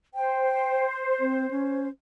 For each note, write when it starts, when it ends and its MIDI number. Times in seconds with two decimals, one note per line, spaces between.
0.15 1.89 72
0.15 0.87 79
1.20 1.49 60
1.51 1.88 61